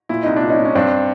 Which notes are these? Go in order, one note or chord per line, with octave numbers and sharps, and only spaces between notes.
A#2 E4
C2 D#4
D4
A#2
C#4 D#4
A#2
C#4
G2 C4 D4